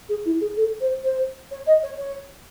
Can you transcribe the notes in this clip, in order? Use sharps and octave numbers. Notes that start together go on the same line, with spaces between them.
G#4
E4
G#4
A4
C5
C5
C#5
D#5
C#5
C#5